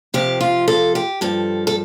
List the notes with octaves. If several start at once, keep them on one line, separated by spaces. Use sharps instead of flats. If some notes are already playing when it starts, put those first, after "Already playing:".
F2 C3 F3 G4
F4
A4
G4
G2 F3 A4
A4